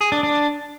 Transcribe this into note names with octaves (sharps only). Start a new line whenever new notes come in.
G#4
D4
D4